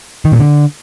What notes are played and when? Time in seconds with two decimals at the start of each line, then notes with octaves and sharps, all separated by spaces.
0.25 D#3
0.32 A#2
0.39 D3